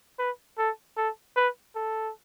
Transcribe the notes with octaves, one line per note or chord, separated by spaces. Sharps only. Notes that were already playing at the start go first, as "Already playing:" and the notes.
B4
A4
A4
B4
A4